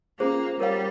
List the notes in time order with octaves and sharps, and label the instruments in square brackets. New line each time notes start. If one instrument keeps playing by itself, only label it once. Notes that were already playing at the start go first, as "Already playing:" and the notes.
[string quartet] A#3 [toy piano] C#4 F4 G#4 C5
[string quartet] G3 [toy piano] A#4 C#5 F5